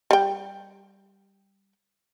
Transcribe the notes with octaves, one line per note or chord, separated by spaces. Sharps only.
G3 G5